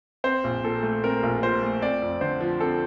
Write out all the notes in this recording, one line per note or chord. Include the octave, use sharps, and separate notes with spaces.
C4 C5
A#1
A#2 A4
A3
C4 A#4
A#1
A#2 C5
A3
C4 D5
F2
D3 C5
F3
C4 A4